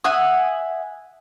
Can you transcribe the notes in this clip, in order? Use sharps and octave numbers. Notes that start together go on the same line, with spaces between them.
E5 F#5 G#5 D#6